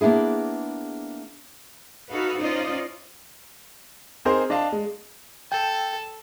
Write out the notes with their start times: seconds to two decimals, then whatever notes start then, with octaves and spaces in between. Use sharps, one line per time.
0.01 A#3 B3 D4 E4 G#4
2.09 D#4 F#4 A4 B4 F5
2.40 C#4 D#4 F4 C5 D5 D#5
4.25 C4 D#4 G#4 A#4 C5
4.50 D4 D#5 F5 A5
4.72 G#3
5.52 A4 G5